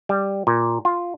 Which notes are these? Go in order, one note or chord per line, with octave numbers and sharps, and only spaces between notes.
G3
A#2
F4